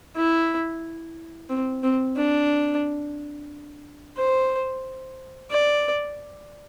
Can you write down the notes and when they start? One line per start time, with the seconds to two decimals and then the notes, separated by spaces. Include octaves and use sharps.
0.16 E4
1.49 C4
1.83 C4
2.16 D4
4.17 C5
5.51 D5